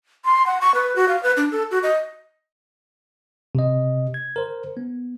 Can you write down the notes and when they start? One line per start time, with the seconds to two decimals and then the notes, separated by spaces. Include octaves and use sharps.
0.25 C6
0.46 F#5
0.61 C#6
0.75 B4
0.96 F#4
1.09 F5
1.23 B4
1.37 D4
1.52 A4
1.71 F#4
1.83 D#5
3.55 C3 D#5
4.14 G#6
4.36 A#4 C5
4.77 B3